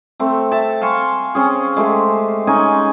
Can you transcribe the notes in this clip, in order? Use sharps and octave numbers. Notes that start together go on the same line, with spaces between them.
A3 C4
E5 A5
F5 G#5 C6 C#6
C4 C#4 G#4
G#3 A3 G4 C5
C#4 D#4 G#5